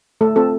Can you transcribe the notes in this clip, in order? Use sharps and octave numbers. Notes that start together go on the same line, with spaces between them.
A3 A4
C4 F4 A4